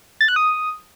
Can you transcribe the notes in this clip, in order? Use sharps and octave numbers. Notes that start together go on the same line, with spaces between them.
A6
F#6
D#6